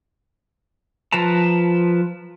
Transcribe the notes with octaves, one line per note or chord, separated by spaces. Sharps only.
F3 B4 A5 A#5